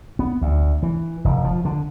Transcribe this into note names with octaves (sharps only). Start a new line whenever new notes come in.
B3
D2
E3
F1
F3
D3